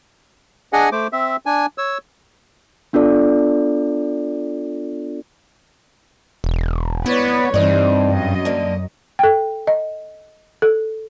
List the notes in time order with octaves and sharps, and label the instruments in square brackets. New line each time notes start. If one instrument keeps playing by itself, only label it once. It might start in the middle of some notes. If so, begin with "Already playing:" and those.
[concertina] D4 G#4 D#5 F#5 G#5
A3 C5 D6
C4 E5
D4 G#5
C#5 E6
[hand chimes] B3 D4 F4 A4 D5
[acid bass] E1
[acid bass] B3 [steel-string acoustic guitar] E4 [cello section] B4 C#5 D5
[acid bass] G2 [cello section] E3 G3 C4 [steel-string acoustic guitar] D4 D#4
[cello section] F#2 F#3 D#5
[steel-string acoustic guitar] D3 A#3
[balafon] A4 G5
D#5
A4